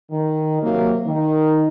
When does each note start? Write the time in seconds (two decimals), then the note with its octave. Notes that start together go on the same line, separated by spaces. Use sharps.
0.11 D#3
0.61 C3 F#3 A#3
1.06 D#3